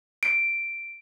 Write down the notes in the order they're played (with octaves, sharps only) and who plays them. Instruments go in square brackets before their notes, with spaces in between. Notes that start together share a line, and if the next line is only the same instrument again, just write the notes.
[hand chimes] D7